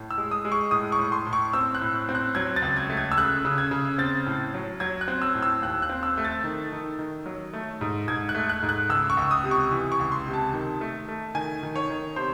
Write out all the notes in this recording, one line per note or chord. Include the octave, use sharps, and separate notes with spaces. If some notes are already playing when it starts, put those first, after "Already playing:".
Already playing: A2
E6
G#3
D#6
G#3
C#6
A2 D#6
C#6
A2
C6
A2
C#6
C4 E6
F#6
A2
C4
F#6
F#3 G#6
A6
C#2
G#6
A3
G#6
E6
C#3 F#6
C#3
G#6
C#3
C4 A6
A2
F#3
F#3 G#6
F#6
C4
E6
A2
E6
D#2 F#6
F#6
C4
E6
A3
A6
D#3
D#3
D#3
F#3
A3
G#2
G#2 G#6
F#6
A3
F#6
G#2
F#6
C#2 E6
C#6
C#2
D#6
C3
C#6
E3
C#6
C#2
C6
C3
A5
D#3
A3
A3
D#3 G#5
D#3
C#5
D#3
C3 C5